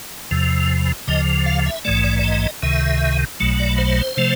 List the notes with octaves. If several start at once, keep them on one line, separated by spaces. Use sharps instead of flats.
E2 C3 F3
D2 C#3 F3 D#5
F5
E5
A#1 G#2 E3 A3 D5
D5
D5
D#5
C#2 C3 D#3 E5
B1 B2 F#3 A3
D5
C5
C3 F3 A3